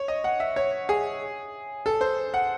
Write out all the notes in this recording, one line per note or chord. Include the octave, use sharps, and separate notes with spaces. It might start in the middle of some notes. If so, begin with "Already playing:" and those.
Already playing: C#5
D#5
F#5
E5
C#5
G#4
A4
C5
F#5